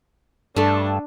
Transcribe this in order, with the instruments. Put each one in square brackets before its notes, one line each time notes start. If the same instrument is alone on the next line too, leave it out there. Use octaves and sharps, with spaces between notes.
[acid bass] G2 [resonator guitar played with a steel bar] A3 A4 [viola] D4